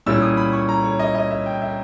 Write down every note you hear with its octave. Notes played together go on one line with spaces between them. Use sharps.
A#2 G3 C#4 E4 E6
D#6
B5
C#6
A#5
C#5
D#5
D#5
E5
G5
E5